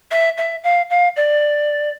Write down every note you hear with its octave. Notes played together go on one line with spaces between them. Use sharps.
E5
E5
F5
F5
D5